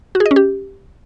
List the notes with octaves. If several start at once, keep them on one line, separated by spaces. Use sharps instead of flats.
F#4
G#4
D#5
C#4
G4